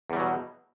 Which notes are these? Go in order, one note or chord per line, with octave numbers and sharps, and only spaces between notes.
E2 B2 F#3 G3